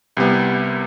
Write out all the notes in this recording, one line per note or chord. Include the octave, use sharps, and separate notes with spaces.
C2 C3 G3 B3